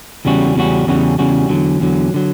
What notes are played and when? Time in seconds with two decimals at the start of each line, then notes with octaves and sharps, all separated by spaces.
0.25 E2 C#3 G3 C#4 F#4
0.56 E2 C#3 G3 C#4 F#4
0.87 E2 C#3 G3 C#4 F#4
1.18 E2 C#3 G3 C#4 F#4
1.49 E2 D3 F#3
1.80 E2 D3 F#3
2.14 D3 F#3